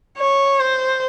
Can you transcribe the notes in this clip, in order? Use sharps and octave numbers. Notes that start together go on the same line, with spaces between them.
C#5
C5